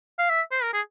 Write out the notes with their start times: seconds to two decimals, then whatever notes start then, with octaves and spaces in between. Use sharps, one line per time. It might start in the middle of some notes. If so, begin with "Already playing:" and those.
0.19 F5
0.30 E5
0.52 C5
0.63 A#4
0.73 G#4